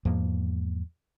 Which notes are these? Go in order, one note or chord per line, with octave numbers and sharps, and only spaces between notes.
E2 G#2 F3 A#3